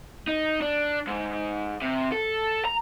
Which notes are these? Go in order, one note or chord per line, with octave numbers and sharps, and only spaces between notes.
D#4
D4
G#2
C3
A4
A#5